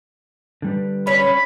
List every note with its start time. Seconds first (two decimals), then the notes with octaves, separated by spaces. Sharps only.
0.62 D3 G3 B4
1.07 C#4 C#5 B5